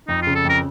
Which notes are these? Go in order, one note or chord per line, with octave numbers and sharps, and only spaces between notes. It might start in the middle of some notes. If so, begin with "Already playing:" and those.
F2 D#4
F4
C#3
A4
F2 A#4